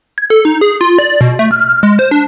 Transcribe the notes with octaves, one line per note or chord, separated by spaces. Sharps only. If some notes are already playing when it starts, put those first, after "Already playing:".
G#6
A4
D#4
G#4
F4
D5
B2
A3
F6
G#3
C5
D4